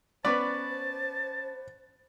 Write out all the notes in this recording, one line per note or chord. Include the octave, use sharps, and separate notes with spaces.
B3 C#4 B4 C5 D5 A5